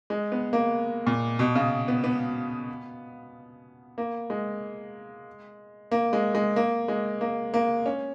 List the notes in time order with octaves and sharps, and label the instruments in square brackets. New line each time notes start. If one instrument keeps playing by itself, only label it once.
[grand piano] G#3
B3
A#3
A#2
B2
C#3
B3
B3
A#3
G#3
A#3
G#3
G#3
A#3
G#3
A#3
A#3
C#4